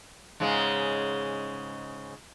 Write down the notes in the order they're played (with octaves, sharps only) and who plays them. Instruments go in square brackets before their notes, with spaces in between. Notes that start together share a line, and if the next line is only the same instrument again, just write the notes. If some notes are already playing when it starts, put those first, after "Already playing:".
[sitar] G#2 C#3 G#3